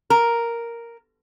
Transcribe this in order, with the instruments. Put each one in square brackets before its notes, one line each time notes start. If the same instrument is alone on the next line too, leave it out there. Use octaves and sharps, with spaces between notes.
[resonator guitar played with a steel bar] A#4